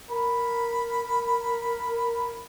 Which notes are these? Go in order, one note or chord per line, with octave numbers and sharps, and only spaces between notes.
A#4 B5